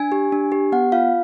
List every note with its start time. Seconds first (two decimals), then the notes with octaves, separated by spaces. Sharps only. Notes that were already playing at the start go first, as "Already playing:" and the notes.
Already playing: D4 G#5
0.12 G4
0.32 D4
0.52 G4
0.72 B3 F#5
0.92 F4 F5